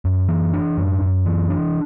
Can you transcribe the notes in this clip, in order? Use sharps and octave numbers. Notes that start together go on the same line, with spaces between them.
F#2
E3
D4
F#2
F#2
E3
D4